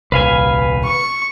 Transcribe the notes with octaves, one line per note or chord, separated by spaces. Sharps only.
D#1 C2 B4 F5 G#5
C#6